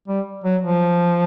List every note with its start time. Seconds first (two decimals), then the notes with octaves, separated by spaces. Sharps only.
0.08 G3
0.44 F#3
0.62 F3